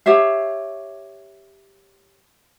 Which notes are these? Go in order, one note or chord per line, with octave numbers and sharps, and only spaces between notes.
G4 C#5 E5 F5